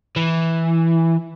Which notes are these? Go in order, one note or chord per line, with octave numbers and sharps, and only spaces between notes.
E3